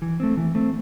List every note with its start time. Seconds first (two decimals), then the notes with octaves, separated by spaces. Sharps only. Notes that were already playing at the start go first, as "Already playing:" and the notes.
0.02 E3
0.20 A3 C4
0.37 E3
0.55 A3 C4